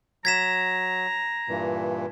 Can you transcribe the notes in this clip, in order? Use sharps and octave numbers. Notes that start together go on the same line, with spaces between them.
F#3 A#5 G#6 B6 E7
G2 A#2 E3